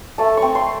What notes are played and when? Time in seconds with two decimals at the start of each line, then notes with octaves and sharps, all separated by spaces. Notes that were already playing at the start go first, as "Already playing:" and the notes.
0.18 A3 A5
0.37 C4 C#6
0.55 C6